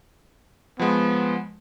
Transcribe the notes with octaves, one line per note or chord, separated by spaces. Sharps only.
F3 G#3 B3